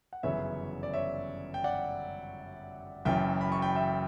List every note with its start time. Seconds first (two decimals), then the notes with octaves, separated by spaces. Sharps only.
0.13 F#5
0.23 G1 F#2 C#3 E3 B3 C#5 E5
0.83 D5
0.94 C#5 E5
1.54 G5
1.64 D5 F#5
3.05 F#1 F#2 E3 E5 G5
3.41 B5
3.52 C#6
3.62 G5 B5
3.75 E5 G5